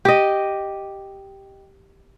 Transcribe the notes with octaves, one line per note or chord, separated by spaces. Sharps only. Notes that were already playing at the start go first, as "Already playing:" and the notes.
G4 D#5